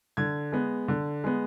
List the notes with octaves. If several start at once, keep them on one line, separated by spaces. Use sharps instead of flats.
D3 G#6
G#3 B3
D3
G#3 B3